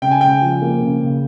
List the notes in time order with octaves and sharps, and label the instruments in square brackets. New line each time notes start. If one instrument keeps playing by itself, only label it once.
[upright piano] C#3 [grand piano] G5
[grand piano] G#5
[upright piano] C#3 [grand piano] G5
[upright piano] F3
A#3
C#3
C#3